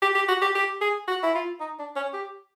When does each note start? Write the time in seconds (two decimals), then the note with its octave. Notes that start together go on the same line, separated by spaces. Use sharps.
0.02 G4
0.15 G4
0.28 F#4
0.42 G4
0.55 G4
0.81 G#4
1.08 F#4
1.23 E4
1.35 F4
1.60 D#4
1.79 D4
1.96 C#4
2.13 G4